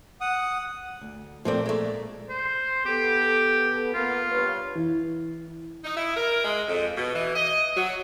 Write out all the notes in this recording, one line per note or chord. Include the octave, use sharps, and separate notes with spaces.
F#5 D#6
D2
A#2 F3 A3 C4 A#4 D5
G#3 A3
C5
B3 G4 A4
A#3 B3 F4
G2 B4 C#5
E3
D#4
E4
A#4
G#3
F2
B2
E3
D#5
F#3